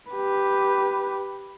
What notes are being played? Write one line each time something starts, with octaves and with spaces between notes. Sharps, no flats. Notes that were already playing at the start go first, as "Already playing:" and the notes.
G4 B4